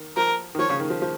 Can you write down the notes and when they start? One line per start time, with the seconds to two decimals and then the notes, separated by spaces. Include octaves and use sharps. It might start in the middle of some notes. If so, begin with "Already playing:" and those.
Already playing: D#3
0.17 F3 A#4
0.55 D#3
0.59 F3 C#5
0.70 C#3
0.80 D#3
0.90 F3
1.02 F3